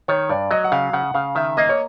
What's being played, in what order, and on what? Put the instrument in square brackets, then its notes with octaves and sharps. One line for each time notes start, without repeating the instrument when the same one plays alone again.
[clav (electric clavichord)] D#3 [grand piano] C#5
[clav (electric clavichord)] G2 [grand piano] D5
[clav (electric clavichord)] F#3 [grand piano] D#5
[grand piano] F#5
[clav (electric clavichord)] C#3 [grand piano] F5
[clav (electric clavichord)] C#3 [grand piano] F#5
[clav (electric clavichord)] C#3 [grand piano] F5
[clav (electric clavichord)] D#3 [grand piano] E5
[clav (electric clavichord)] A#3 [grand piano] D#5
[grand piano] C#5